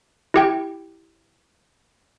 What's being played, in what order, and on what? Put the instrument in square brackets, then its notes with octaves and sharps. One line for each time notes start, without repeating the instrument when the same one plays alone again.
[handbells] E4 G4 G5